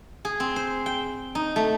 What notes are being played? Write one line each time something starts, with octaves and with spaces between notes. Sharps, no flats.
G#4
C4
C5
G5
D#4
A3